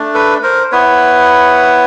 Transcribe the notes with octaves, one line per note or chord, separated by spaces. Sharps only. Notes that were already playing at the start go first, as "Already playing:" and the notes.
Already playing: A3 D4
A4 B4
A#4 C5
B3 E4 B4 C#5